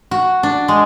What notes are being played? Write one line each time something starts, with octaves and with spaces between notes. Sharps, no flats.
F#4
D4
G#3